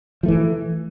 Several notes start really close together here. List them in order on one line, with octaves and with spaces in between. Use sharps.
F3 A3 E3